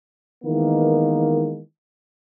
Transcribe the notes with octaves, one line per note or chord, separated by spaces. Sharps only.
D#3 E3 G#3 A#3 B3